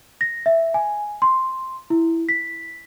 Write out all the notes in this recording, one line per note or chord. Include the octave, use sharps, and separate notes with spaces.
A#6
E5
G#5
C6
E4
B6